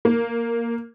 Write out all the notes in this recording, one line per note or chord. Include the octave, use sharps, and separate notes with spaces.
A#3